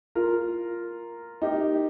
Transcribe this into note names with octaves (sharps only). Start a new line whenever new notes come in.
F4 A#4
D#4 G4